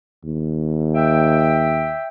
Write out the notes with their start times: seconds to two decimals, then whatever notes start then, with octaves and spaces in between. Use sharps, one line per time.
0.24 D#2
0.93 E5 G5